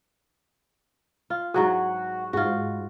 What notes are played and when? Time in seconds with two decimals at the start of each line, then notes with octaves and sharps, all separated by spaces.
1.30 F4
1.54 G#2 F#3 F#4 G#4
2.33 G#2 F4 F#4